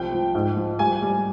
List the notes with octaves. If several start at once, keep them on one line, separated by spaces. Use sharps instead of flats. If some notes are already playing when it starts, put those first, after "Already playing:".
Already playing: C2 F3 G5
F3
G#2
F3
G3 G#5
G3